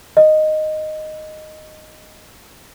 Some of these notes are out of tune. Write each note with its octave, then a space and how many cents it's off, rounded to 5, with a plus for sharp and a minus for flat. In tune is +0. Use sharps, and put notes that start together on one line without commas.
D#5 -5